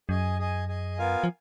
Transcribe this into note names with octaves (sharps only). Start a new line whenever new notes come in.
F#2 G#4 D#5 G#5
G#4 D#5 G#5
G#4 D#5 G#5
B3 F4 A#4 F5 G#5
F3